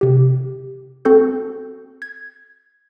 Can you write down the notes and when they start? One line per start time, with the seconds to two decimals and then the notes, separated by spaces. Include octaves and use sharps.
0.01 C3 G4
1.05 C4 F#4 A4 G6
2.02 G#6